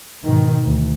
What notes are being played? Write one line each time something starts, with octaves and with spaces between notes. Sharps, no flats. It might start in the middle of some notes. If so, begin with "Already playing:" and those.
G#2 B2 D#3
D2